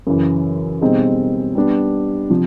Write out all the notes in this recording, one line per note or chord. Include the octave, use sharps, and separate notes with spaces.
F#2 C#3 E3
B2 G3 C4 D#4 G#4
G3 B3 D4
C3 F3